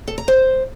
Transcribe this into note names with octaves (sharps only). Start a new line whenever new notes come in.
A4
A#5
C5